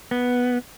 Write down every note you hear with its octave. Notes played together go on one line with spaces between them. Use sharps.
B3